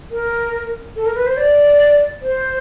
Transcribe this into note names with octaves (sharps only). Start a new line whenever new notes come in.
A#4
A4
A#4
B4
C5
D5
C5